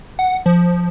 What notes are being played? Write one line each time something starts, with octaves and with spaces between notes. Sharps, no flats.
F#5
F3